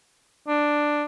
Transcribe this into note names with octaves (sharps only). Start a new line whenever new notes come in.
D4